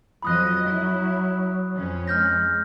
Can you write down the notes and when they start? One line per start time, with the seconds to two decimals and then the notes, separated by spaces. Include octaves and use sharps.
0.23 F2 F3 F#3 D#5 B5 D#6 F#6
0.68 E4
1.76 F2 C#4
2.08 G#3 F6 G6 A#6